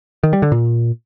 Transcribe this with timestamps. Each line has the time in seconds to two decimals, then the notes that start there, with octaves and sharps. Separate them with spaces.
0.23 D#3
0.33 G3
0.42 D3
0.52 A#2